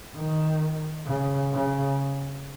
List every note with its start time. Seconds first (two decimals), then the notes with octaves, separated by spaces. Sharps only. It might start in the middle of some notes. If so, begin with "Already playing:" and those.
0.16 D#3
1.06 C#3
1.52 C#3